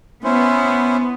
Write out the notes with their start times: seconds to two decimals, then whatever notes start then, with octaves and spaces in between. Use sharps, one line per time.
0.24 B3 C#4 E4 C5